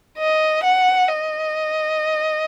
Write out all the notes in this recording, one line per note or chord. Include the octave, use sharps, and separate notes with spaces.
D#5
F#5
D#5